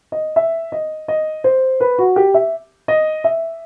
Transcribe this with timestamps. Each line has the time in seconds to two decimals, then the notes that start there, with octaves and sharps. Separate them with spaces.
0.12 D#5
0.36 E5
0.72 D#5
1.08 D#5
1.44 C5
1.80 B4
1.98 F#4
2.16 G4
2.34 E5
2.88 D#5
3.24 E5